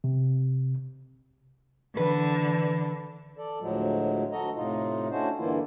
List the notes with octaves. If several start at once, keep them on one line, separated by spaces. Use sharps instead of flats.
C3
D3 E3 B4
A4 D5
D2 A2 F3 F#3 G#3
D2 F#4 A4 D#5 A#5
A2 C3 D#4 F4
A3 C#4 D4 E4 F#4 C5
G2 D3 E3 A#3 E4 F4